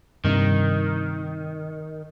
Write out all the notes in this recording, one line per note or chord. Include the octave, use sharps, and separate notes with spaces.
G2 C3 D#3